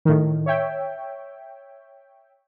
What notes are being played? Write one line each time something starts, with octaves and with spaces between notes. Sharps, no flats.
A2 D#3
C#5 E5 G5